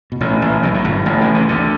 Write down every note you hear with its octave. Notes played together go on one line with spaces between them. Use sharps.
B2
A1 A2
A1 A2
B1 B2
A2
G1 G2
A1 A2
B2
C3
D2 D3